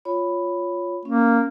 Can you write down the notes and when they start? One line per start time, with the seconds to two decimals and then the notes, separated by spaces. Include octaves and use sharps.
0.05 F4 C#5 B5
1.05 A#3 C#4